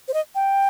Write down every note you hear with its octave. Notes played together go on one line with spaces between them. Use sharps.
C5
D#5
G5